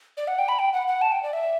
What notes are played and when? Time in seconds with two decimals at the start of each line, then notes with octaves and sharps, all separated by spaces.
0.17 D5
0.28 F#5
0.39 G5
0.48 B5
0.59 G5
0.73 F#5
0.88 F#5
1.02 A5
1.12 G5
1.23 D5
1.33 E5